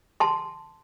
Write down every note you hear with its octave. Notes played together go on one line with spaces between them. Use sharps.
A5 C6